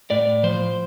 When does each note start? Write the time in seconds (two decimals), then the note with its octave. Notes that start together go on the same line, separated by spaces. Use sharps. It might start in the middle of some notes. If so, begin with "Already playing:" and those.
0.10 A2 D5
0.43 F3 C5